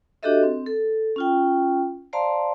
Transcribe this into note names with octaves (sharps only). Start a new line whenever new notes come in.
D4 F#4 G4 A4 D#5 E5
C4
A4
C#4 F4 G5
C5 D5 F5 A5 A#5 C6